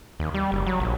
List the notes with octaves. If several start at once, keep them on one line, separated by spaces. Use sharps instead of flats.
D#2
G3
F#1
F#3
A#1